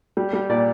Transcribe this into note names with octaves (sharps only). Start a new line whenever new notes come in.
G3
G3
A#2 D5